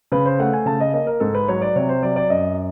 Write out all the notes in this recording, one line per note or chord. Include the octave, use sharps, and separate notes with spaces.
C#3 B4
C5
A3 F#5
G#5
C#3 A5
D#5
A#3 D#5
A#4
G#2 A4
B4
F#3 C#5
D5
C3 C#5
C5
F#3 D5
D5
F#2 D#5